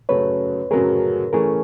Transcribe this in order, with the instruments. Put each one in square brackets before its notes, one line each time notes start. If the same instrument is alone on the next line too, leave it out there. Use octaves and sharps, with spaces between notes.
[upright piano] F#2 C#3 F#3 A3 [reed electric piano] B4 C#5
[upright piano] F#2 C#3 F#3 A3 [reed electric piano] G#4 A#4
[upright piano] E3 A3 C#4 [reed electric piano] G#4 A#4